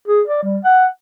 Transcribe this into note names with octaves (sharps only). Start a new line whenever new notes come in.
G#4
D5
G3
F#5